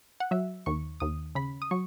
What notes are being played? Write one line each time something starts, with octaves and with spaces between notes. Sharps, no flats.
F#5
F#3 E5
D#2 C#6
D#2 D#6
C#3 B5
D#6
F#3 C#6